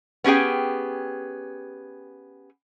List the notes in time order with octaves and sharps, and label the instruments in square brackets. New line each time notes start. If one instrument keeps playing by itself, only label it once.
[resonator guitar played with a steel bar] B3 C#4 G4 G#4 G5